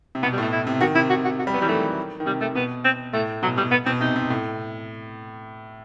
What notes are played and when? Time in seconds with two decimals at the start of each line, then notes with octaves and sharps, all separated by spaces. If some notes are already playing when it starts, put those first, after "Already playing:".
0.15 C3
0.23 B2 B3
0.32 G3
0.38 A2 A3
0.52 E4
0.67 C3
0.81 D#3 F#4
0.95 C3 E4
1.10 F#4
1.25 F#4
1.39 F#4
1.47 G3
1.53 F#3 B3
1.62 E3 G3
1.69 D#3 A3
2.20 D#3
2.26 C3 G3
2.41 C3 A3
2.55 B2 B3
2.85 C4
3.14 A2 A3
3.43 B2 F#3
3.57 B2 G3
3.71 B3
3.86 B2 C4
4.01 C3 D#4
4.16 C3
4.30 A2